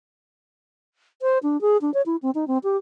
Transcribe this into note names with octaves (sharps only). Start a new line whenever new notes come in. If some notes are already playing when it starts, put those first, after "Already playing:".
C5
D4
G#4
D4
C#5
E4
C4
D#4
C4
G4